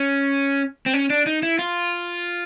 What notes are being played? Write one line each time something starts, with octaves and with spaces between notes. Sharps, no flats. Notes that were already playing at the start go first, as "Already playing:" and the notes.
Already playing: C#4
C4
C#4
D4
D#4
E4
F4